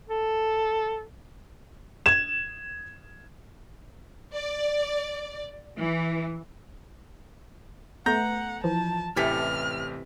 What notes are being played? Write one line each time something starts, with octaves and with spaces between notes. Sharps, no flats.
A4
G#6 E7
D5
E3
A3 B3 F#5 A#5 G6 A#6
E3 F3 A5
A1 C3 E3 E4 G4 A4 F6 B6